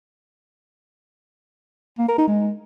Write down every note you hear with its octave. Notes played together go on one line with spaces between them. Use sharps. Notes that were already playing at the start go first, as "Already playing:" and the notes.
A#3
A#4
D#4
G#3